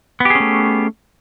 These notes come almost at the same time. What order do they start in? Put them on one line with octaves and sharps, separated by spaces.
B3 G4 G#4 C#4 A3